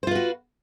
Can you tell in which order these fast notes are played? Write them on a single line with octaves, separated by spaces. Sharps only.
C5 F4 B4 F#4